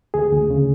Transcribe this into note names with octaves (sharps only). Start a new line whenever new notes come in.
D2 G#4
D2
C#3